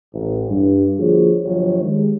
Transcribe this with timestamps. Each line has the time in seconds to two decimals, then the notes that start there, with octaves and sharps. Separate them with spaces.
0.13 A1
0.48 G2
0.98 D3 F3 A#3 F#4 G#4 C#5
1.44 G1 F3 F#3 C#5
1.81 D#3 G3 G#3